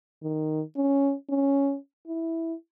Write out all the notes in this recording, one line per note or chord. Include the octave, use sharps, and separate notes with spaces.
D#3
C#4
C#4
E4